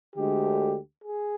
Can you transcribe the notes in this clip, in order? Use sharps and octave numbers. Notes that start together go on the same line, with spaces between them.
D2 D3 G#3 G4
G#4